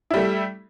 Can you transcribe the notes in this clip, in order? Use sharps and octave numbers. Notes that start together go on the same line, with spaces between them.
G3 A3 E4